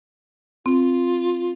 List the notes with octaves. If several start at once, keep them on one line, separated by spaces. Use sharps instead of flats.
C4 F4